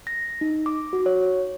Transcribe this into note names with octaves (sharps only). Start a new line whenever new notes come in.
A#6
D#4
D6
F#4
C#5